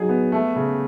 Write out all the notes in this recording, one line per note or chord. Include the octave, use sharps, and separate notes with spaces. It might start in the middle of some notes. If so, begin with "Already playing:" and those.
Already playing: F#3 D#4 G#4
B3
A3
C#3